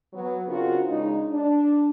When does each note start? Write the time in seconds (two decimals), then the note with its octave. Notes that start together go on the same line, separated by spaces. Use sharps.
0.13 F#3 B3
0.48 C#3 C4 D4 F4 F#4 A#4
0.87 C#3 G#3 D4 D#4
1.32 D4